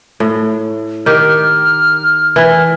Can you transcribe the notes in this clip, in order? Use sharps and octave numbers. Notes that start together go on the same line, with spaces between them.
A2
D#3 G4 F6
E3 E4